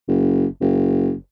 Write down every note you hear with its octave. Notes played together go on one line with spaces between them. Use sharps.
F#1
F#1